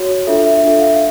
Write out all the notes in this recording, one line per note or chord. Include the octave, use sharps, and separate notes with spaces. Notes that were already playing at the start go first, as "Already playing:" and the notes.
Already playing: F#4 C#5
D4 F4 A4 E5
E5
D4 F4 A4 E5
F5
E5